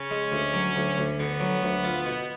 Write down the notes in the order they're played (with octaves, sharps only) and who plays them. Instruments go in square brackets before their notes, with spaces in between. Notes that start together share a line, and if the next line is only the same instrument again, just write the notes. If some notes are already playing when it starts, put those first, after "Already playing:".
Already playing: [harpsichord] C#3 [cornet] C#4
[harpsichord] G#3
D2
F#3
D2
D2
[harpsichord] D3 [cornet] B3
[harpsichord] F#3
D2
F4
B2